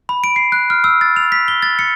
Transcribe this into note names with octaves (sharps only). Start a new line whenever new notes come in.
B5
D7
C7
F#6
F6
E6
A6
F7
B6
G7
A6
C#7